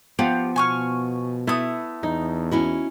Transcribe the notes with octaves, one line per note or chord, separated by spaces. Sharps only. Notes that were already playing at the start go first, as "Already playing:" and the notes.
F3 B3 G4 F5 F#5
B2 G#5 C#6 F6
A3 B3 E4 D#6
E2 D#4
C#4 E4 F#4